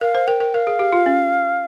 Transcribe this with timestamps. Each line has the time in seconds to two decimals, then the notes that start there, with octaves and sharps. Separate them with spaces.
0.01 A#4 F5
0.15 C5
0.27 A#4 G5
0.40 A#4
0.54 A#4 F5
0.67 G#4
0.79 G4
0.92 F4
1.06 C#4